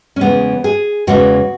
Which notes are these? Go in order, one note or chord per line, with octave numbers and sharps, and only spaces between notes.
C#4
E2 C#3 E3 G#3 B3
G#4
E2 C#3 E3 G#3 F#4